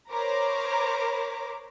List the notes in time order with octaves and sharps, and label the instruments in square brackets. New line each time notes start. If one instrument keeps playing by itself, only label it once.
[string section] A#4 C5 C#5 A#5 B5 D6